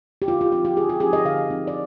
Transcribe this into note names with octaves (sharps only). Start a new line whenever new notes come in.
G4
D3 F4
F4
F3 C4 D#4 F4
G4
D3 G#4
G4
F3 C4 D#4 G#4
D#5
D3 F5
F3 C4 D#4
D5